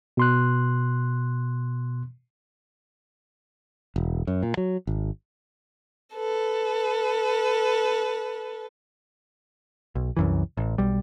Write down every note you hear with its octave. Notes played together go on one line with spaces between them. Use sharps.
B2 C6 F#6
E1
F#2
A#2
F#3
G#1
A4 B4
B1
C2 F#2 E3
A1
B1 G3